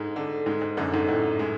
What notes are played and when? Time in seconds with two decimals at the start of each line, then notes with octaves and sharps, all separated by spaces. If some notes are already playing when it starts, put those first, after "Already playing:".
Already playing: G#2 D3 G#3
0.16 D3
0.46 G#2 G#3
0.62 G#2
0.77 F#2 D3
0.94 G#2
1.08 A2 D3
1.39 G#3